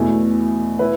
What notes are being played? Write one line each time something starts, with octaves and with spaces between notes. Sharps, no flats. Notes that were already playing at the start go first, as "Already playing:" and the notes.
Already playing: E2 B2 A3 E4
E4 B4